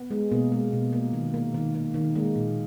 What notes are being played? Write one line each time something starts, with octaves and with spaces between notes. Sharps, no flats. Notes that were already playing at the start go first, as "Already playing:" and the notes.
Already playing: B3
G#3
B2 A#3
G#3
B2
A#3
D#3
A#3
D#3
A#3
D#3
G#3 A#3
A#2